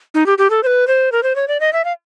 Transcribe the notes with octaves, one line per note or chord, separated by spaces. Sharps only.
D#4
G4
G4
A4
C5
B4
C5
A#4
C5
C#5
D5
D#5
E5
F5